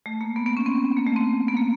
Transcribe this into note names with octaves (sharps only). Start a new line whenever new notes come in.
A3
A#3
B3
B3
C#4
C4
A#3
A3
C4
B3
A#3